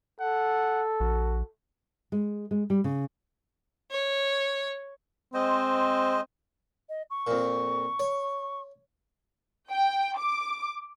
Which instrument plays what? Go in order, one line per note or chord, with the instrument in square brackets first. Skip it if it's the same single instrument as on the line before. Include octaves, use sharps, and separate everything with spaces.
[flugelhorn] A4 [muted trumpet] F#5
[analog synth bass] A#1 [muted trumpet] F#4
[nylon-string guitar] G#3
G#3
G3
C#3
[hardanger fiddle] C#5
[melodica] G#3 C5 D#5 [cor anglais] C4
[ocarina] D#5
C#6
[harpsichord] F2 A#2
C#5
[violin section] G5
D6